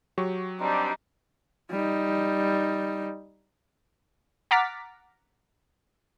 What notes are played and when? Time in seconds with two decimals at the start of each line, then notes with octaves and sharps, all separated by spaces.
0.18 F#3 G4 C#6
0.61 G3 C4 D4 D#4
1.71 G3 D#4
4.51 F#5 A#5 D6 F6 A6 B6